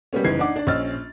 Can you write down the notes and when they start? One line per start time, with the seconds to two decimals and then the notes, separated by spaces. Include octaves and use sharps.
0.13 G3 A#3 B3 C#4
0.24 F#1 E3 D#4 G#6 C7
0.39 D4 D#4 F#5 D6
0.56 D4 D5
0.67 A#1 C#4 D#5 E6 F6 A6